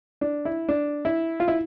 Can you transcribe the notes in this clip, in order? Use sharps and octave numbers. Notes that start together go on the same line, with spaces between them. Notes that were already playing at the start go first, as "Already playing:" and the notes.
D4
E4
D4
E4
F4
E4